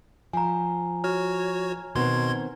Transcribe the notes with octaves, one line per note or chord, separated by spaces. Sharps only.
F3 G#5 A#5
F#4 C#5 F6
B2 D#3 B3 C4 C6 G#6